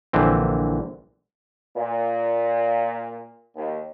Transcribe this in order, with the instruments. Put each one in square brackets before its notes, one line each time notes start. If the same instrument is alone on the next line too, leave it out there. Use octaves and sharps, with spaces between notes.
[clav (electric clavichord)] A#1 D3 E3 C4
[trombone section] A#2
D#2